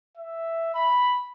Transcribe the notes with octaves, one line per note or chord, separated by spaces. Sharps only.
E5
B5